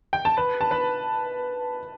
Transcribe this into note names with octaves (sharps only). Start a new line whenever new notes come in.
G5
A5
B4 B5
A5
B4 B5